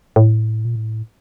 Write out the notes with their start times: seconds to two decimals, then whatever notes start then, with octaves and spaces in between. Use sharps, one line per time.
0.16 A2
0.65 A#2
0.76 A2